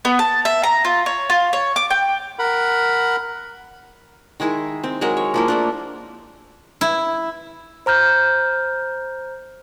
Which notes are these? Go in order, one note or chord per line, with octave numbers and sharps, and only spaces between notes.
B3
A5
E5
A#5
F4
C#5
F4
C#5
D6
G5
A#4 F#5 B5
D#3 G#3 E4 G#4
C4
F#3 G#3 A#4
C#5
F3 A#3 E4
A3 A#3 D4
E4
C5 A#5 F6 G6